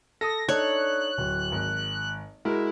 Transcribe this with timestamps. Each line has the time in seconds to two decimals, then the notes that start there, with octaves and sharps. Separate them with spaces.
0.21 A4 D#6 A#6
0.49 D4 D#4 A4 C#5 F#6
1.18 D1
1.52 G#1
2.45 G#3 E4 F#4 A#4